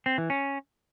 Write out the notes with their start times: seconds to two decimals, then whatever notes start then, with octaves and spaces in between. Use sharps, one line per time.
0.06 C4
0.18 E3
0.30 C#4